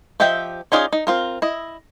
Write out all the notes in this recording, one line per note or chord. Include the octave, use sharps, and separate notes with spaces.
F3 G4 D#5 E5 G5
C#4 D#4 F4 G#4 D5
D#4
C4 F4 A#4
E4 D#5